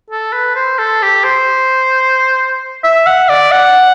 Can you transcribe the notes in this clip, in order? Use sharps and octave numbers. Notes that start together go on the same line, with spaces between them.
A4
B4
C5
A4
G4
C5
E5
F#5
D5
F#5